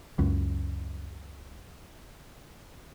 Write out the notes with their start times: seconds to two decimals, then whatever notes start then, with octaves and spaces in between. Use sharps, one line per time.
0.19 C#2 F#2